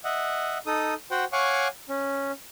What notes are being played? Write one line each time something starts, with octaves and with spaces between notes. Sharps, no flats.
D#5 E5 F#5
D#4 A4 D#6
F#4 C5 F#5 G5
C#5 F5 F#5 G#5 C#6 D6
C#4